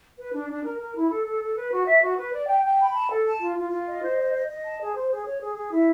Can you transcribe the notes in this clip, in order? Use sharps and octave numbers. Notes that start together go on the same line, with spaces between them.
B4
D4
D4
A#4
A#4
E4
A4
A4
A4
B4
F#4
E5
F#4
B4
D5
G5
G5
B5
A5
A4
A5
F4
F4
F4
D#5
C5
D#5
D#5
D#5
A5
G#4
C5
G#4
C#5
G#4
G#4
E4